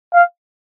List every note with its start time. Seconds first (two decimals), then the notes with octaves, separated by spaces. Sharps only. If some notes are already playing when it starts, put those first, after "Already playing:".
0.14 F5